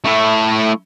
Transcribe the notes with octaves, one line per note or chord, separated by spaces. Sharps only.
A3 E4